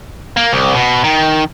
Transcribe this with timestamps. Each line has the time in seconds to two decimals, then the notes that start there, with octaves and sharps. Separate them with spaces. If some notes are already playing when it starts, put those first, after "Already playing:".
0.37 A#3
0.53 C2
0.75 B2
1.04 D#3